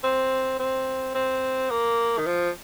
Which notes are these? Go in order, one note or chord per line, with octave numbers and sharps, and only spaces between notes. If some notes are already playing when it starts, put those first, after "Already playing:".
C4
C4
C4
A#3
D#3
F3